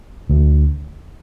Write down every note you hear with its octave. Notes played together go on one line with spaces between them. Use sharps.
D2